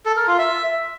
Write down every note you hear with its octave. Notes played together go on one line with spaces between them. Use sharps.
A4
A#4
F4
E5